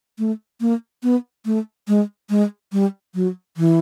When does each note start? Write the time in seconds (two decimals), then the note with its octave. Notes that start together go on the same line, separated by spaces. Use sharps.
0.19 A3
0.61 A#3
1.03 B3
1.45 A3
1.88 G#3
2.30 G#3
2.72 G3
3.15 F#3
3.57 E3